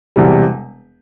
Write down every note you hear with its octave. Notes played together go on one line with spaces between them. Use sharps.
E1 E2 C3 G3